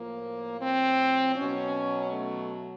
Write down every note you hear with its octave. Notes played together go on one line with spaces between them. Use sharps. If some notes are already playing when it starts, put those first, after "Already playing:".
Already playing: A2 F3 A#3
C4
B2 F#3 C#4
A3